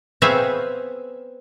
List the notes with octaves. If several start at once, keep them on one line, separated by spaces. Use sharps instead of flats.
B3 C4 G#4 C#5 E5 F5